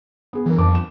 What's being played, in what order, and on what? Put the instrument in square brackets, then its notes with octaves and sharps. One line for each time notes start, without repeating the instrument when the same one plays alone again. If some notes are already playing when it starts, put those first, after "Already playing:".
[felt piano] B3 G#4
[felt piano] G1 A#4 [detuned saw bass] E3
[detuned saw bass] F2 [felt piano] A5 D6
[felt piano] E7